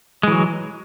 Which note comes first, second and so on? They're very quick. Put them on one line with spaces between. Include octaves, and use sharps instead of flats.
G#3 E3 F#3